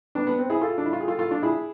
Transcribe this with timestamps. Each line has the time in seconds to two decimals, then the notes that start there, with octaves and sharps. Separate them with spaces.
0.15 B3 D4
0.27 B3
0.39 C4
0.50 E4 G#4
0.61 F4 A4
0.78 D4
0.86 E4
0.93 F4
1.00 G#4
1.08 F4 A4
1.19 F4 A4
1.31 D4 F4
1.43 E4 G#4